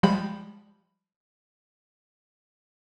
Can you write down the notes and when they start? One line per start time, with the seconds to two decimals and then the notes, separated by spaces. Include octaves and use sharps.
0.03 F3 G3 G#3 B5 G6